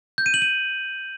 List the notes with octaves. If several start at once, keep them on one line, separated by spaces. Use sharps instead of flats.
G6
D#7
F#7
D#7